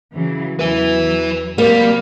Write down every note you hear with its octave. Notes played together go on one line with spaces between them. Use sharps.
C#3 E3 F#3
E2 F#3 B4 E5
C3 F#3 G3 A#3